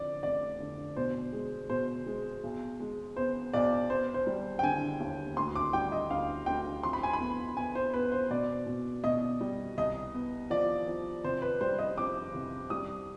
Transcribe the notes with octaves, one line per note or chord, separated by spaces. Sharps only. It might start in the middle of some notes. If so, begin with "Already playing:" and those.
Already playing: F2 D3 D5
F1 D5
D3
B2 C5
G#3
B2 C5
G#3
B1
G#3
B3 C5
B1 D5
B3 C5
C5
G3
G5
D3 G#5
D#2
D2 C6
D6
G3 G5
D#5
D2 F5
D2 G5
F2 C6
B5
G#5
B5
B3
B3 G#5
C5
B3 B4
C5
B2 D5
B2
B2 D#5
G3
C2 D#5
B3
F3 D5
F3
C3 C5
B4
G3 C5
D#5
F2 D6
C3
G3 D#6